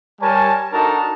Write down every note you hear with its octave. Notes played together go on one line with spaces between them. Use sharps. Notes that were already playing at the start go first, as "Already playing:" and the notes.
G3 A#4 C#5 G#5 A5
D4 D#4 F#4 A4 A#4 A5